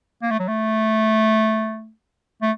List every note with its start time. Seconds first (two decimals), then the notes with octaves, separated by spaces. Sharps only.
0.23 A#3
0.31 A3
0.39 F#3
0.48 A3
2.42 A3